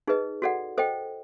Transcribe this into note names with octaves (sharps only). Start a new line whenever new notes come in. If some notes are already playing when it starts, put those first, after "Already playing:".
D#4 G#4 B4 D#5
F#4 A4 D5 F#5
A4 C5 D#5 G5